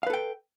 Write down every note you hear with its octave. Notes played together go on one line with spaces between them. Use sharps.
A4 B4 F5 G5